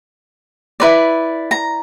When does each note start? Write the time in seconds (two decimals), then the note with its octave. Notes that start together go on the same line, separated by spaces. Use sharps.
0.80 E4 B4 D5
1.51 A#5